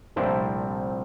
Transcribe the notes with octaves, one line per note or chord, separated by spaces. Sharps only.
C2 A#2 F3 A3 C4 D4 E4